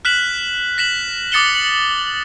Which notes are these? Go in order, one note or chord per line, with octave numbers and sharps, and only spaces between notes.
F6 F#6 B6 E7 F#7
A#6 B6 E7 F#7
D6 D#6 A6 C#7 E7 G7
F#7